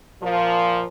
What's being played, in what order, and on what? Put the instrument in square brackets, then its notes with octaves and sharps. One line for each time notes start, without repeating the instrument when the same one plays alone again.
[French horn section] A#2 F3